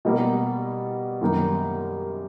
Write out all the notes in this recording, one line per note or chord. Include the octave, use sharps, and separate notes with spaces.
B2 G3 A#3
F#2 D#3 G3 A#3 D#4